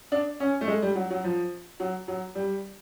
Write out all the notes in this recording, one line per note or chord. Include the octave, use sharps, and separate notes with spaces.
D4
C#4
A3
G#3
G3
F#3
F#3
F3
F#3
F#3
G3